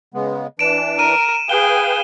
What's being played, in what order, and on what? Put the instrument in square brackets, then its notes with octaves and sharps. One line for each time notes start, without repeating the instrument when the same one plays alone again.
[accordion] C#3 G#3 B3
[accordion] E3 D4 [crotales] D7 E7
[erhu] A#4 [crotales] D#7
[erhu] G#4 [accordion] B4 F5 G5 [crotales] G7